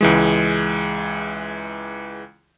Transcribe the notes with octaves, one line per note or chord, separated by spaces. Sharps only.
C#2 E3 G#3